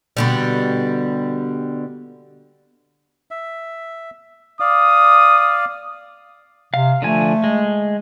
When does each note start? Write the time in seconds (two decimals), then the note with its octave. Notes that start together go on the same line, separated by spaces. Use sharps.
0.17 B2 D3 G3
3.31 E5
4.60 D5 F5 D#6
6.74 C3 F5
7.02 D3 F3 A3 G#5
7.44 G#3